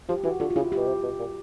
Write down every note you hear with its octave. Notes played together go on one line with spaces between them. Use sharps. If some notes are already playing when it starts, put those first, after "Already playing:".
F3 G4
E3 F#4
D3 F4
F4
C#3 E4
B2 G4
C3
B2
A#2